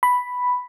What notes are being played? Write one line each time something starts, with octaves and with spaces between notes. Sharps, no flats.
B5